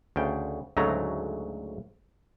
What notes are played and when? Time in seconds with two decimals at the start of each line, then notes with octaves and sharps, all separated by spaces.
0.16 D2 C#3 G5
0.77 D2 G#2 C#3 F#3 A3 A#5